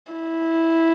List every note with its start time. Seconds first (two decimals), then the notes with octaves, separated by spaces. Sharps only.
0.12 E4